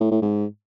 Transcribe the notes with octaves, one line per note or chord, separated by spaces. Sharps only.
A2
A2
G#2